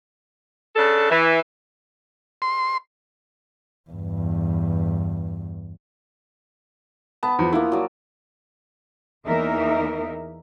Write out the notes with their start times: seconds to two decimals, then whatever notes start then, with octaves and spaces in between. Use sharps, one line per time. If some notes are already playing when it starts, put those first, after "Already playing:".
0.76 C#3 D4 A4
1.10 E3
2.42 C6
3.90 E2 G2
7.23 B3 A5
7.39 E2 F3
7.52 F3 A#3 E4
7.72 F#3 D5
9.26 E2 E3 A#3 D#4 A#4 E5